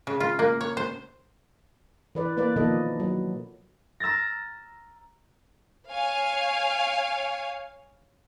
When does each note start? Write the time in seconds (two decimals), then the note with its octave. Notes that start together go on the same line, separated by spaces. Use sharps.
0.07 C#3
0.20 F4
0.39 A#3
0.61 C#5
0.77 C5
2.15 E3 B4 D5
2.37 A#3 B4 D5
2.56 B2 D#3 F3 A#3 A4 D#5
3.00 F#3
4.00 A#5 E6 F6 A6 A#6
5.88 C#5 F5 G#5